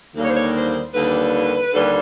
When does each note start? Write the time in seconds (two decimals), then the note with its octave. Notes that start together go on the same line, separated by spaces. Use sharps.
0.14 D#2 D3 G3 A#3
0.23 C#5
0.30 C5
0.36 C#5
0.55 C5
0.93 D#2 D3 G3 A#3 B4
1.72 D#2 D3 G3 A#3